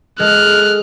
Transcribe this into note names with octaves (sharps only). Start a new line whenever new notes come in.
G#3 A4 F6 F#6